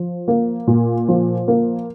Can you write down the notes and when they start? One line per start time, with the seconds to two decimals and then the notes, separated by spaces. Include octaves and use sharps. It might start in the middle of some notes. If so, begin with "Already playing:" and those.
Already playing: F3
0.28 A#3
0.67 A#2
1.09 F3
1.48 A#3